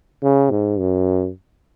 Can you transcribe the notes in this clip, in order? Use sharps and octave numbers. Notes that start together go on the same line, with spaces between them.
C#3
G#2
F#2